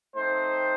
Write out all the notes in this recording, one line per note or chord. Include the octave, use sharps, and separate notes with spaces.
A3 C4 D#4 C5